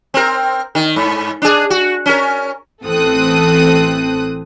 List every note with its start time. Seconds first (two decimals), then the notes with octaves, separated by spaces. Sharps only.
0.14 C4 A#4
0.75 D#3
0.96 G#2
1.42 D4 G#4
1.70 F#4
2.06 C#4 A#4
2.83 A1 E3 C4 A4 D#6 F#6